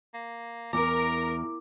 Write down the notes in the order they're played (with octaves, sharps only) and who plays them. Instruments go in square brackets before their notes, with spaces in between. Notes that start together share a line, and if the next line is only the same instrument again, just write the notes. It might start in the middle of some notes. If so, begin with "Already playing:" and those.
[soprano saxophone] A#3
[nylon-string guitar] E2 [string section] A#4 [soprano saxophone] A#5 [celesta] D6